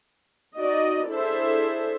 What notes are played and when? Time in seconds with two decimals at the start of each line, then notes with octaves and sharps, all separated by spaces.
0.57 D#4 F#4 D5 D#5
1.07 D4 E4 G#4 A4 C5 E5